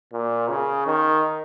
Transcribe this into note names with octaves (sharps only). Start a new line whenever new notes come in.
A#2
C#3
D#3